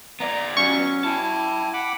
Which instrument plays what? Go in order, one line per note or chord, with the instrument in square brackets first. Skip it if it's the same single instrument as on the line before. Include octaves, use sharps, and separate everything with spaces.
[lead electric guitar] B3 D5 [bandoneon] A#5
[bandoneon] F#3 C#4 [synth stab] C#6
[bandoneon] E4 [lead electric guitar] G5 A5
[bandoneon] F#5 B5 D6